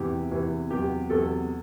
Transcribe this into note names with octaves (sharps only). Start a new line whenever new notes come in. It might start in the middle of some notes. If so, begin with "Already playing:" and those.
Already playing: E2 C3 E3 G4
E2 C3 E3
E2 C3 F#3 G4
E2 C3 F#3 A4